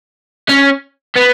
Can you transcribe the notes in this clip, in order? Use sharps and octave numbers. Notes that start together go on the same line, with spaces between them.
C#4
B3